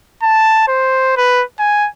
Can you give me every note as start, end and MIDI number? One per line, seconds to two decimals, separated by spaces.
0.23 0.65 81
0.68 1.15 72
1.17 1.43 71
1.60 1.88 80